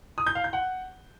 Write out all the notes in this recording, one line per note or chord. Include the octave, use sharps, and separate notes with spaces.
D#6
G6
F5
G6
F#5